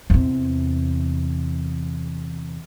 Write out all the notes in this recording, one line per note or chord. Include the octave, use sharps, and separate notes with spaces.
E2 C3